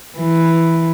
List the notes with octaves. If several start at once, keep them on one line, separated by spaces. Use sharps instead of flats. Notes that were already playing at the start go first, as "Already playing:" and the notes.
E3